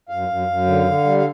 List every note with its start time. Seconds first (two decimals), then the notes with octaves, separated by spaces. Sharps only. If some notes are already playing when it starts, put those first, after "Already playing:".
0.09 F#2 F5
0.28 F#2
0.47 F#2
0.66 D3
0.86 D3
1.04 G3
1.18 F5